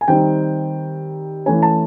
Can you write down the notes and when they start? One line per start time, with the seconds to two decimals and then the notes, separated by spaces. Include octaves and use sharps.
0.01 G#5
0.08 D#3 G3 C4 D#4 G5
1.46 E3 A3 C#4 G#5
1.63 A5